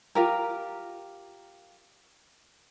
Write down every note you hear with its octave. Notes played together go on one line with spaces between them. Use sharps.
F4 G4 A#4